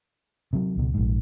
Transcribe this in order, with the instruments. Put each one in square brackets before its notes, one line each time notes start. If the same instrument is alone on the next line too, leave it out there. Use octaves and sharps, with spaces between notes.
[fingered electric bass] C3 F#3
C#2 B2
A#1 G#2